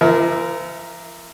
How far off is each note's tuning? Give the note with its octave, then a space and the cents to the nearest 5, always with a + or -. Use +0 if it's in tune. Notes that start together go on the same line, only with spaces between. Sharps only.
F3 -45 A#4 +0 E5 -20